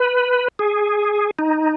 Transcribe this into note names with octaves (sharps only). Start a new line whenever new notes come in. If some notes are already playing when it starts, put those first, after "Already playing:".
Already playing: B4
G#4
D#4